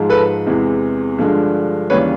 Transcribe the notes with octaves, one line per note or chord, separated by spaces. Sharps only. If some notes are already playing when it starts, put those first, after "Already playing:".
Already playing: G#2 F3 G#3
A4 B4
E2 C3 E3 G#3
G2 D3 F3 G#3
D#2 C#3 E3 G3 B4 C#5